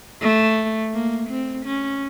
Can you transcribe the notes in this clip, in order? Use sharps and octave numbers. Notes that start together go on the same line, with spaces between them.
A3
A#3
C4
C#4